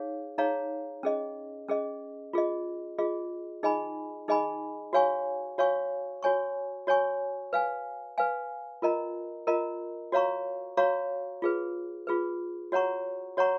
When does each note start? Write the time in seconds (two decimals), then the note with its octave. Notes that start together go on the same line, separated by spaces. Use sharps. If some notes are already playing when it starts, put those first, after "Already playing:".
Already playing: D#4 G#4 C#5 F5
0.38 D#4 G#4 C#5 F5 A#5
1.03 C#4 G#4 D#5
1.68 C#4 G#4 D#5
2.33 F4 G#4 D#5
2.98 F4 G#4 D#5
3.63 D#4 G#4 D#5 G#5 B5
4.28 D#4 G#4 D#5 G#5 B5
4.93 F#4 C#5 F5 G#5 C#6
5.58 F#4 C#5 F5 G#5 C#6
6.23 F#4 C#5 G#5 C#6
6.87 F#4 C#5 G#5 C#6
7.53 B4 F5 G#5
8.18 B4 F5 G#5
8.82 F4 A#4 D#5 A#5
9.47 F4 A#4 D#5 A#5
10.12 F#4 C#5 F5 A#5 C#6
10.77 F#4 C#5 F5 A#5 C#6
11.42 F4 G#4 B4
12.07 F4 G#4 B4
12.72 F#4 C#5 F#5 A#5 C#6
13.37 F#4 C#5 F#5 A#5 C#6